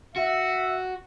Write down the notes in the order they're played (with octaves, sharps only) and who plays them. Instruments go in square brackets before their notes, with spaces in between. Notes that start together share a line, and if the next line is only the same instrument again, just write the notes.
[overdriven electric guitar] F#4 [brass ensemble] E5